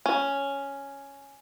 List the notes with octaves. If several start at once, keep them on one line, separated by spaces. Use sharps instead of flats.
C#4